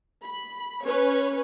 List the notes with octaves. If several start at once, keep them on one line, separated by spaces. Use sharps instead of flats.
B5
C#4 B4 C#5